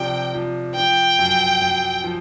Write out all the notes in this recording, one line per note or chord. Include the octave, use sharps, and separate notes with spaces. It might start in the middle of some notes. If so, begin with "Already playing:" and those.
Already playing: C3 F3 D4 G5
F3
F3 G5
F#2
F#2
F3